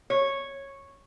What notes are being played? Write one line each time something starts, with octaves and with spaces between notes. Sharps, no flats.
C#5